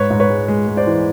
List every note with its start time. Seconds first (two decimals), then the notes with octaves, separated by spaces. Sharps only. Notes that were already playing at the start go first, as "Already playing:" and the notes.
Already playing: G#2 B4 C#5
0.10 G#2
0.20 B4 C#5
0.29 G#3
0.48 G#3
0.67 G#3
0.77 C5 D5
0.87 E3